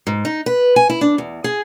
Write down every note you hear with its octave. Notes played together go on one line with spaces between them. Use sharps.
G#2
D#4
B4
G#5
E4
D4
E2
G#4